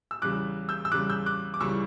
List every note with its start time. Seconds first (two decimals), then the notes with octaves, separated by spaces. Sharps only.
0.11 E6
0.22 E2 C#3 G3 D6 F#6
0.69 E6 G6
0.85 E6
0.92 E2 C#3 G3 D6 F#6
1.09 E6 G6
1.26 D6 F#6
1.54 D6
1.60 C#2 C#3 E3 G3 C#6 E6